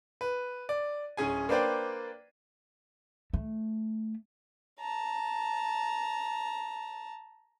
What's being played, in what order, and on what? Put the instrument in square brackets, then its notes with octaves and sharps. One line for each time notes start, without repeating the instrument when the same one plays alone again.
[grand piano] B4
D5
D1 C#4 G#4 G#5
A#3 D4 B4 C5 D5 G5
[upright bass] A3
[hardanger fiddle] A5 A#5